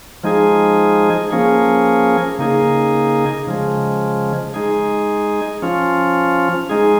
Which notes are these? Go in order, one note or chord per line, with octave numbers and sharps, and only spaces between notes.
F3 G#3 D#4 G#4
F3 A#3 C#4 G#4
C#3 A#3 D#4 G#4
C#3 F3 G#3
G#3 D#4 G#4
F3 C#4 F4
G#3 D#4 G#4